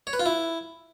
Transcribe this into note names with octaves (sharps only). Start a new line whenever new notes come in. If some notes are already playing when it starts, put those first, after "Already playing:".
C#5
B4
F4
E4